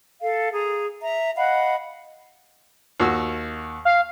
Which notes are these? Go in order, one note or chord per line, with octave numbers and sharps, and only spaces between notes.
A4 F5
G#4 A#5
E5 A#5
D#5 F5 F#5 B5
D#2 F#4 E6
F5